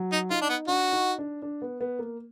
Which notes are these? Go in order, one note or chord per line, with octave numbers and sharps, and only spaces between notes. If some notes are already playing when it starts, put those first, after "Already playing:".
Already playing: F#3
D#4
D#4 F4
D4
B3
D4 F#4
D#4
D4
D4
B3
B3
A#3